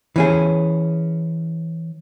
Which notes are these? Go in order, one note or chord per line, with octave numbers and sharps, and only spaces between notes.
E3 C#4 G#4